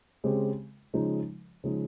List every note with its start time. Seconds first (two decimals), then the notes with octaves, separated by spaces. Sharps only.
0.24 C#3 G#3 C4 G4
0.93 C#3 F3 G#3 D#4
1.64 C#3 F3 G#3 D#4